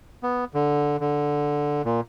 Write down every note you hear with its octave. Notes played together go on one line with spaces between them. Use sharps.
B3
D3
D3
A#2